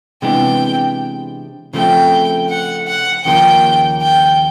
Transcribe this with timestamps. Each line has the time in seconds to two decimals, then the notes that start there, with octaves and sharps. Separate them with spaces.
0.22 C3 E3 G#3 B3 D4 G5
1.73 C#3 F3 A3 C4 G5
2.49 F#5
2.87 F#5
3.24 D#2 C#3 F3 A#3 G5
4.01 G5